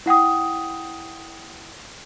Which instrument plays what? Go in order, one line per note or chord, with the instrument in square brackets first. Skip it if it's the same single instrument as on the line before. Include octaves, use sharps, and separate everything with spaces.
[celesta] E4 F#5 G5 D#6